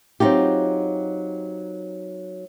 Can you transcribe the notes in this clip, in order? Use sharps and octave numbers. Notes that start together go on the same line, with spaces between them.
F#3 C4 D#4 F4 G4